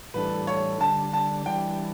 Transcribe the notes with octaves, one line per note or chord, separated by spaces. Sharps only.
A2 E3 G3 D4 A4 B4
C#5
D3 G3 D4 A5
A5
E3 G3 D4 G5